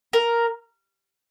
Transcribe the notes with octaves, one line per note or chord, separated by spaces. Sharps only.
A#4